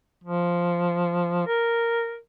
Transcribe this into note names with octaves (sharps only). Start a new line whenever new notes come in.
F3
A#4